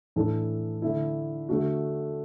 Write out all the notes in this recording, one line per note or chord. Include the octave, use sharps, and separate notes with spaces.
A2 E3 D4 A4
D3 A3 E4
D3 A3 D4 F#4